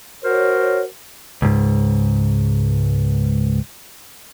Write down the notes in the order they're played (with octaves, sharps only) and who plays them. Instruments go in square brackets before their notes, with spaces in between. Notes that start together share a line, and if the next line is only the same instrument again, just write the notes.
[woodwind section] F#4 A#4 C5 C#5
[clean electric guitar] C#2 G#2